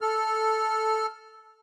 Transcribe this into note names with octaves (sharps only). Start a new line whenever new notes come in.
A4 F6